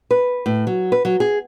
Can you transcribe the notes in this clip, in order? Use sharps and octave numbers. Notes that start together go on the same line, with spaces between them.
B4
A2
F#3
B4
F#3
G#4